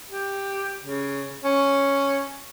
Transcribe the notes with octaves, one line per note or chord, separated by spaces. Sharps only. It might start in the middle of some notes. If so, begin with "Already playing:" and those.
G4
C#3
C#4